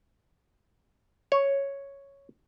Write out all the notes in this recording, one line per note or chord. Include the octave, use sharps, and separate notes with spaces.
C#5